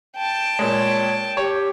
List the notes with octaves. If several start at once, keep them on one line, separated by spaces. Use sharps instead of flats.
G5 A5
A#2 G#3 C#5
G4 C#5